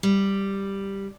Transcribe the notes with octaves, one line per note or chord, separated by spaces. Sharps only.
G3